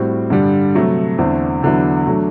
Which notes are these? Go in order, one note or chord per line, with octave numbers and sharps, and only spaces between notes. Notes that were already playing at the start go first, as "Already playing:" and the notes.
Already playing: A2 G3 C4 F#4
G2 D3 G3
C3 F#3 A3
E2 D3 A3 C4
E2 D3 F#3 B3 E4
D3 F#3 A3